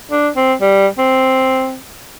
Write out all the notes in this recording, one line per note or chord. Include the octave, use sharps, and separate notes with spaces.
D4
C4
G3
C4